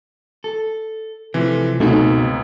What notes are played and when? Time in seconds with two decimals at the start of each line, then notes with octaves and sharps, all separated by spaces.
0.44 A4
1.34 C3 E3 F3 A3
1.80 C#2 F#2 B2 A3 C4 D#4